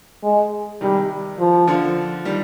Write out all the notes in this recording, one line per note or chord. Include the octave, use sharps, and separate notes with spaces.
G#3
C3 D#3 G3
F3
D3 F3
D#3 G3